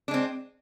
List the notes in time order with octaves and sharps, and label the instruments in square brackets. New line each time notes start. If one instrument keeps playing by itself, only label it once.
[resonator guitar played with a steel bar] D4
G#3
C4